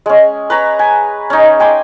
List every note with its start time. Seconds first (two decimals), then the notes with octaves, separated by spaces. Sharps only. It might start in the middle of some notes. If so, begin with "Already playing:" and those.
0.06 G#3 C#4
0.50 B4 C#5 A#5
0.79 G#5
1.30 C#4 D#4
1.60 G5 G#5 C6 D6